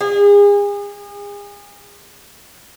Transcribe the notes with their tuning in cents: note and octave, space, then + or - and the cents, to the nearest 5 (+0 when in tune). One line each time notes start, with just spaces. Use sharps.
G#4 -35